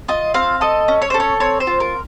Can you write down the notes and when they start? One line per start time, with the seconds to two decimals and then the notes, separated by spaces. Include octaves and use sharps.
0.08 F4 D#5
0.34 C4 F5
0.61 A4 D#5
0.88 C#4
1.02 C#5
1.10 A4 C5
1.20 C#5
1.40 C4 C#5
1.60 C5
1.67 F4
1.80 A#4